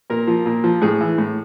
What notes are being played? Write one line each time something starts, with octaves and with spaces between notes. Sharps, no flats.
A#2 A#4
F3
A#2
F3
A2 G#4
E3
A2